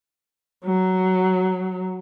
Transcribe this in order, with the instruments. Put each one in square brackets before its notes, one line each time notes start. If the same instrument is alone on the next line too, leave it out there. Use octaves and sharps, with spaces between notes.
[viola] F#3